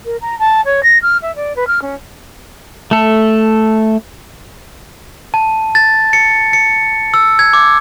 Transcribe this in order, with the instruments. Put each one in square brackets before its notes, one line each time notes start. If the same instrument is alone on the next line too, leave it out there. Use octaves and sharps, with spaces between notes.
[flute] A#4
A#5
A5
C#5
A#6
F6
E5
D5
B4
F6
C#4
[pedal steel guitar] A3 A4
[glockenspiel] A5
A6
C#7
C#7
E6
G#6
D6